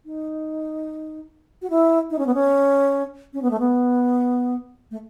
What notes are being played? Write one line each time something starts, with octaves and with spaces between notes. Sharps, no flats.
D#4
F#4
E4
D#4
C#4
B3
C#4
C#4
B3
A3
B3
A3